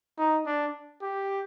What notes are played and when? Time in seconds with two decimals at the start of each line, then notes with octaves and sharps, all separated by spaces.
0.18 D#4
0.46 D4
1.02 G4